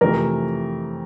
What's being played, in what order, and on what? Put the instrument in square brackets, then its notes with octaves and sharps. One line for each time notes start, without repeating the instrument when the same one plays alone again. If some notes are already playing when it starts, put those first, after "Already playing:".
[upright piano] F2 C3 E3 A3 [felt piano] A#4